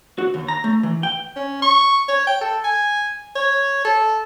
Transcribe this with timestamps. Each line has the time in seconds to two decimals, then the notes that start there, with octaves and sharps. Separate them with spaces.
0.18 F#4
0.34 D#2
0.48 A#5
0.64 A3
0.83 E3
1.03 G5
1.36 C#4
1.62 C#6
2.08 C#5
2.27 G5
2.41 A4
2.64 G#5
3.35 C#5
3.85 A4